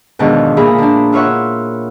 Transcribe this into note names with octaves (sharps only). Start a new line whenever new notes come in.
E2 G#2 B2 D3 D#3 F3
A#2 F3 E4 G#4 A#5 B5
D3 D4
E4 F4 C#5 E5 F#5